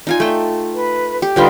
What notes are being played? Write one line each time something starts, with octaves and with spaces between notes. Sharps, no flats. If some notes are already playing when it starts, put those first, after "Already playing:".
D#4 F4 G#5
A3 G5
B4
G4
D3 G3 D#4 F4 B4 G5